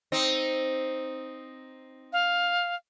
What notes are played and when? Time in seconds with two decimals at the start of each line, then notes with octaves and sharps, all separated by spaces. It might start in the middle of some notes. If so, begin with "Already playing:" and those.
0.12 C4 D#4
2.13 F5